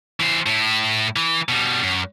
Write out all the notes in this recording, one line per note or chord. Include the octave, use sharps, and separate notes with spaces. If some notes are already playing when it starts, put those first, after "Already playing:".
E3 C5
A2 E4
E3
B2 G3
F#2